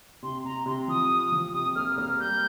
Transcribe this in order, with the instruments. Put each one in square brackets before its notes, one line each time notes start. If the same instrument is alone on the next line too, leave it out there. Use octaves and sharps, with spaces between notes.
[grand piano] C3 [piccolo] C6
[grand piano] C3 [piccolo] A#5
[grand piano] C3 [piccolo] C6
[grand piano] F3 [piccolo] D#6
[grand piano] F4
F3
[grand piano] C3 [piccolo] D#6
[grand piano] A#3 [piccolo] F6
[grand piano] A#3 [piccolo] F6
[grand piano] G3 [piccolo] G6